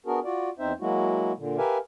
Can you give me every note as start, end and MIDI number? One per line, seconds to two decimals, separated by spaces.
0.06 0.19 59
0.06 0.19 62
0.06 0.19 66
0.06 0.19 68
0.06 0.19 70
0.25 0.50 65
0.25 0.50 66
0.25 0.50 74
0.59 0.73 40
0.59 0.73 60
0.59 0.73 63
0.59 0.73 72
0.59 0.73 76
0.81 1.32 54
0.81 1.32 56
0.81 1.32 58
0.81 1.32 64
0.81 1.32 66
1.37 1.58 46
1.37 1.58 50
1.58 1.78 67
1.58 1.78 70
1.58 1.78 71
1.58 1.78 76
1.58 1.78 77
1.58 1.78 80